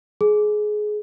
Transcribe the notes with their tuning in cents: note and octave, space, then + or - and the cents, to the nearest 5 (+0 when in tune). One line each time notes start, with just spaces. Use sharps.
G#4 +20